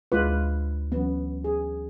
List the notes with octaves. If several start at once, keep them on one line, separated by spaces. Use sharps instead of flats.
D2 G#3 F4 B4 D6
E3 F#3 B3 C#4
G#4